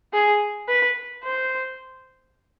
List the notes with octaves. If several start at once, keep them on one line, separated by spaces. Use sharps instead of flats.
G#4
B4
C5